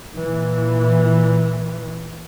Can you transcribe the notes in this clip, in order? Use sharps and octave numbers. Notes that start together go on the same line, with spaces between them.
A#2 E3